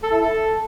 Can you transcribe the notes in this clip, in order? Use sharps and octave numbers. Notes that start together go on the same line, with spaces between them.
A4
E4
A4